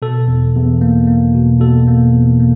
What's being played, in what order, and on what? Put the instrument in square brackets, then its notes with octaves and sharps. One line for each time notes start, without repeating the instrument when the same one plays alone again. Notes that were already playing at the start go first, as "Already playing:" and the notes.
[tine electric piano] B2 A4
E2
E2
A#3
A#3
B2
B2 A4
A#3
E2
A#3